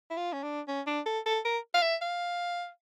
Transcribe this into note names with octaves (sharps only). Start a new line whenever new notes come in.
E4
F4
C#4
D4
C#4
D4
A4
A4
A#4
F5
E5
F5